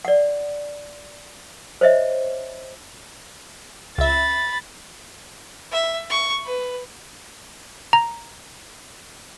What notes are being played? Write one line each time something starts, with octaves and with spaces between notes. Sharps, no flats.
D5 F#5
C5 C#5 D#5 E5
C#2 E5 B5 A6
E5
C#6
B4
A#5